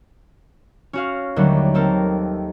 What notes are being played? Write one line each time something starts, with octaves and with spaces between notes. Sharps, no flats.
C#4 F#4 F5
D#2 D3 F#3 G3 A3
A#3 C4 A4 A#4